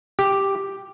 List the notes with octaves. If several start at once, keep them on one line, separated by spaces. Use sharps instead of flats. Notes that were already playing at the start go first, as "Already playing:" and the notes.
G4